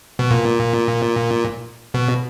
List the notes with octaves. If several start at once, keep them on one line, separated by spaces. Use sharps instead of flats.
B2
A#2
B2